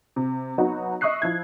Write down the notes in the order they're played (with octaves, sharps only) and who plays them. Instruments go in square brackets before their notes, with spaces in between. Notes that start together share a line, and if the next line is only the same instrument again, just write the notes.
[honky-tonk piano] C3
F#3 B3 D#4 F#4
D#5 E5 C#6 D#6 F#6 C7
F3 E4 G#6